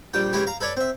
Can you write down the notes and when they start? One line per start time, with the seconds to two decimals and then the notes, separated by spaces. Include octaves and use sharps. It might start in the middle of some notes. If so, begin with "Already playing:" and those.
0.14 A#1 G3 G5
0.33 C#3 E3 G#3 E4 G4
0.47 F5 A#5
0.61 A4 B4 C#5 D5
0.77 C4 E5